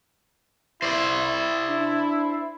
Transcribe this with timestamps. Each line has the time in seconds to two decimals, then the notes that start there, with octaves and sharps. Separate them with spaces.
0.82 E4 C5 D5
1.70 D4